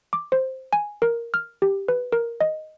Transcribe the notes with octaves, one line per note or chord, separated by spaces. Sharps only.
D6
C5
G#5
A#4
F6
G4
B4
A#4
D#5